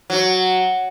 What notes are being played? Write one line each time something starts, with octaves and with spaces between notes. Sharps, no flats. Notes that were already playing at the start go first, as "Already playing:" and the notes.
F#3